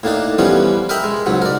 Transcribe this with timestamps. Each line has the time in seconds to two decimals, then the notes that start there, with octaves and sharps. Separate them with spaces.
0.03 A2 A#3 D4 D#4
0.38 E3 F3 G3 B3 C#4
0.89 A#4 D#5 E5 G5 A#5 B5
1.04 G#3
1.26 C#2 G#2 F#3
1.42 A#4 D5